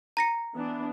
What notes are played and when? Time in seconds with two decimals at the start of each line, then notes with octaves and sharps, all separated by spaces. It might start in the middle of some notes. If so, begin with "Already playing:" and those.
0.17 A#5 A#6 C#7
0.54 E3 B3 D4